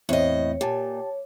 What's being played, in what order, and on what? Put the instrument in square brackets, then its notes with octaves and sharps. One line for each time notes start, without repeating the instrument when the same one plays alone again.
[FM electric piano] E2 C4 [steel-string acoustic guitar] A2 D#5 [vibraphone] C#5
[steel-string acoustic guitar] A#2 [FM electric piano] G4 A5